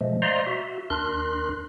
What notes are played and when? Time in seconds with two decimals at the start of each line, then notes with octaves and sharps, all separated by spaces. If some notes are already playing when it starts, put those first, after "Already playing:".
0.01 B2 F3 G#3 A3
0.22 C5 D5 D#5 F5 A#5 C6
0.47 F#4 E5
0.90 D#2 D4 A#4 C6 F#6